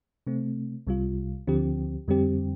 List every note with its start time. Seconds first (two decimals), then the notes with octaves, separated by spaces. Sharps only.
0.27 C3 A3 C4
0.87 C2 C3 G3 F4
1.47 D2 D3 F3 C4 G4
2.08 F2 D3 G3 C4 G4